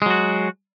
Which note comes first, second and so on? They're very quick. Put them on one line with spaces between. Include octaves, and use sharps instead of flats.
G#3 F#3 F#4